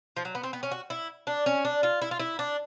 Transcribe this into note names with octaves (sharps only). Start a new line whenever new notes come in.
F3
F#3
B3
C4
B3
C#4
F#4
E4
D4
C#4
D4
F4
E4
F4
E4
D4